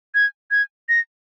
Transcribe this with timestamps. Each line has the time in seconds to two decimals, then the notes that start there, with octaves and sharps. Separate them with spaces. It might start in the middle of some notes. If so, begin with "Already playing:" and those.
0.15 G#6
0.51 G#6
0.89 A#6